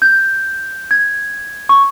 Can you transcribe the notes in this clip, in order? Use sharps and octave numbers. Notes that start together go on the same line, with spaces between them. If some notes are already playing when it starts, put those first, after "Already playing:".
G6
G#6
C#6